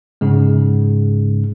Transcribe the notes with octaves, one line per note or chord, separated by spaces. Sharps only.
G#2 C#3 G#3